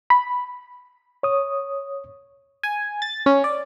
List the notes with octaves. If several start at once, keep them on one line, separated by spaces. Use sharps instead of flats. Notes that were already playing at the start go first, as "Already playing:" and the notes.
B5
C#5 D#6
G#5
A6
C#4
D5